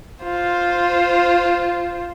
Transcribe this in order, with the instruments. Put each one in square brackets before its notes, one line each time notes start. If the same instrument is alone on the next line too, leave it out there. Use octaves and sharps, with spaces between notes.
[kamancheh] F4 C5